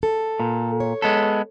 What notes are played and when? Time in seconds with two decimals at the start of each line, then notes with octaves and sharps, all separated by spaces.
0.03 A4
0.40 A#2
0.80 C#5
1.02 G#3 B3 A4